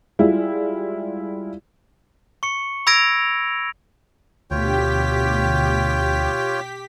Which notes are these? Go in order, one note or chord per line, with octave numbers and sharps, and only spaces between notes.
G3 G#3 E4 F4
C#6 C#7
B5 E6 G#6 A#6 D7 F7
D2 B2 F4 G4 C#5 G5 B6